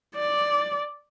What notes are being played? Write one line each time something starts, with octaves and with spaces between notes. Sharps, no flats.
D5